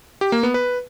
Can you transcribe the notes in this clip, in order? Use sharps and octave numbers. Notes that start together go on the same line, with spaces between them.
G4
A#3
B3
B4